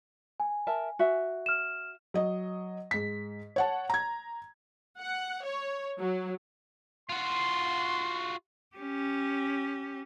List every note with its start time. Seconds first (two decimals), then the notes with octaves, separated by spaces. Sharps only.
0.40 G#5
0.67 A#4 E5 A5
0.99 F#4 E5
1.46 F6 E7
2.14 F#3 D#5
2.91 G#2 B6
3.56 C#5 F#5 A5
3.90 A#5 G#6
5.00 F#5
5.44 C#5
5.98 F#3
7.09 F4 F#4 C6
8.76 C#4 G4